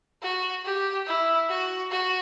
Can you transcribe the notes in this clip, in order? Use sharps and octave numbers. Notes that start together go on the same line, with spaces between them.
F#4
G4
E4
F#4
F#4